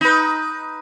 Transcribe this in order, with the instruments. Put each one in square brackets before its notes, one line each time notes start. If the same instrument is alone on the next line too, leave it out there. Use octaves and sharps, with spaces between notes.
[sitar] D#4 B4